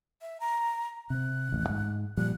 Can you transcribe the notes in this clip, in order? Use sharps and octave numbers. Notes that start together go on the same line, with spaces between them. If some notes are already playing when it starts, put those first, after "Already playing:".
E5
A#5
C3 C4 F#6
A1 D#2
G#2
A#2 F3 G3 F#6